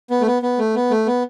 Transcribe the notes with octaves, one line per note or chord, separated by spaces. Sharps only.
B3
A3
B3
B3
A3
B3
A3
B3